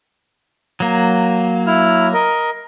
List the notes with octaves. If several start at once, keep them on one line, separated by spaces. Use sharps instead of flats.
F#3 A#3
E4 F6
A#4 D#5